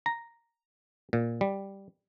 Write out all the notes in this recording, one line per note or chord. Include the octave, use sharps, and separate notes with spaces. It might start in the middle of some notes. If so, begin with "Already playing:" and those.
A#5
A#2
G3